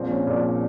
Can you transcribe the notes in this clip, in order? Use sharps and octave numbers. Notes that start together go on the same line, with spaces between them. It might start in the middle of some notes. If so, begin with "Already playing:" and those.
Already playing: A#1 A#2 F3 C4
C#4
A#1 A#2 F3 D4